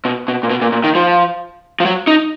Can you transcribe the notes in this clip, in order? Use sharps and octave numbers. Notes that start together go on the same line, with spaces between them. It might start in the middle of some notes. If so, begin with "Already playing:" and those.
B2
B2
A#2
B2
A#2
A#2
D#3
F3
F3
F#3
D#4